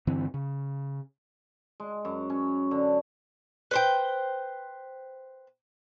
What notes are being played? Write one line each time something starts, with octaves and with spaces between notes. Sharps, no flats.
G2 D3 E3 C4
C#3
G#3
F#2
C#4
D3
B4 C5 G5